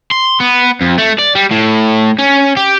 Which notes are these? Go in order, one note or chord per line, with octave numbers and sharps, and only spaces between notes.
C6
B3
F2
A3
D5
G3
A2
C#4
G4